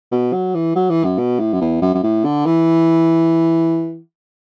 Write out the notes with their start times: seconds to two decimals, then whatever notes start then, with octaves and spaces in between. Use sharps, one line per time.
0.12 B2
0.33 F#3
0.55 E3
0.76 F#3
0.90 E3
1.04 F#2
1.18 B2
1.40 A2
1.53 F#2
1.61 E2
1.82 F#2
1.94 F#2
2.03 A2
2.25 D3
2.46 E3